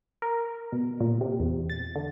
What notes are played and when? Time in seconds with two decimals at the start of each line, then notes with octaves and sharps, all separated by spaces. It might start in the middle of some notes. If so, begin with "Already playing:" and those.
0.22 A#4
0.72 B2
1.01 A#2
1.21 C3
1.40 E2
1.70 A6
1.96 D3